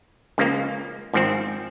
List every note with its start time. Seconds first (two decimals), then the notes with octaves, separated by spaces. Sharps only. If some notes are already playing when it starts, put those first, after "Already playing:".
0.38 C#2 C#3 F3 A#3
1.13 G#1 G#2 F3 C4